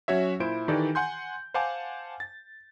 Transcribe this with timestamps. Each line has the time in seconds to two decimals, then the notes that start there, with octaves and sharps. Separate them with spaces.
0.08 F#3 C#4 F#4 C#5 E5
0.40 A#2 E4 C5 D7
0.68 D#3 E3 D#4 G4 A4 D5
0.95 F#5 G#5 C6 G6
1.54 C5 F5 F#5 G#5 A5 D6
2.20 A6